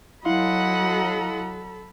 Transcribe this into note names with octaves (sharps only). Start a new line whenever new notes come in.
F#3 E4 A4 D#5 F5 F#5 B5 C6